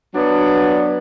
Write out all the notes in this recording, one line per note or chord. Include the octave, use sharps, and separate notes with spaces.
F#3 B3 D4